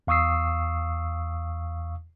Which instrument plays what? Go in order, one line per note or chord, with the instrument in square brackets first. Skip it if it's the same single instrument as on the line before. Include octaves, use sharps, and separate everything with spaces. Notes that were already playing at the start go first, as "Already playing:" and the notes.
[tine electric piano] E2 F5 C#6 D#6 E6 C7